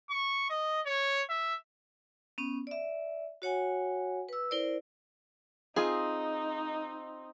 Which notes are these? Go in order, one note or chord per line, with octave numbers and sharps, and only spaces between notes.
C#6
D#5
C#5
E5
B3 C#4
D5 E5
F#4 C#5 F#5 G#5
B4 E6
E4 A#4 C5 D5
C4 D#4 F4 G#4 D#5